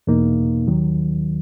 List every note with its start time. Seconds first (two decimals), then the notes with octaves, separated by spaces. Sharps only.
0.07 E2 B2 A#3 D#4
0.67 D#2 D#3 F#3